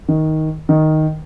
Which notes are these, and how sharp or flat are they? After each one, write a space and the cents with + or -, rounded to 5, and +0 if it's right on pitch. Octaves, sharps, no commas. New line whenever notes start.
D#3 +10
D#3 +0